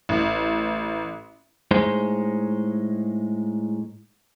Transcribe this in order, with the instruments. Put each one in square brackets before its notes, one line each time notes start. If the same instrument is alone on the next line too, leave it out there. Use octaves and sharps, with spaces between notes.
[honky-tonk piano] A1
[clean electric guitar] A2 G#3 D#4 C5